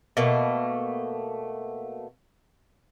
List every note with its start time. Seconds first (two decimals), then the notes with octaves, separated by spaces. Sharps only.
0.17 B2 A3 A#3